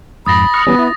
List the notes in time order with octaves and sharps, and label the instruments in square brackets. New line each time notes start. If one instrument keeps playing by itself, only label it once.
[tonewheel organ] F2 G#2 [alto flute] B5 [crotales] D#6 A6 A#6
[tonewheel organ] C#6 F6 F#6
[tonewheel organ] E3 G3 C#4 [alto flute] B3
[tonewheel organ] E4